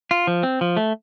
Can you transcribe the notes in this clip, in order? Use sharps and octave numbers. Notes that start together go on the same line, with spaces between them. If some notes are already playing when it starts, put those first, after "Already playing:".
F4
F3
C4
F3
A3